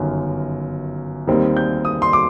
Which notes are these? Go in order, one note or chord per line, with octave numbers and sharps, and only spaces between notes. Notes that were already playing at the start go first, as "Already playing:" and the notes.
Already playing: G1 F#2 D#3
D#2 D#3 G3 C4
G6
D#6
C6
D6